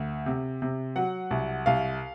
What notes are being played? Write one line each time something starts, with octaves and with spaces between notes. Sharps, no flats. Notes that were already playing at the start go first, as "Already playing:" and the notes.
Already playing: D2
C3
C3
F#3 F#5
C2
C2 F5